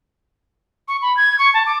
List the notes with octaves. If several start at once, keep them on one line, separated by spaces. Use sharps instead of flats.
C#6
B5
G#6
C#6
A5
D6